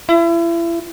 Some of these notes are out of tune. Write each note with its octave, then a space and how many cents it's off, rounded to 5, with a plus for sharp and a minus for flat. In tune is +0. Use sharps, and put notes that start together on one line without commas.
E4 +35